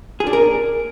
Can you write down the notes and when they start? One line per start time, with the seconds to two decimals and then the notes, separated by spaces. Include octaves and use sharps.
0.20 G#4
0.27 D4
0.33 A#4